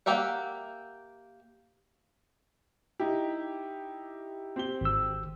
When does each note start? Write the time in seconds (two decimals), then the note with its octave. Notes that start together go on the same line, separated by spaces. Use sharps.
0.06 A#3 G4 A#4 E5 F#5
3.00 D#4 E4 G4
4.56 C4 G4 G7
4.81 G#1 E6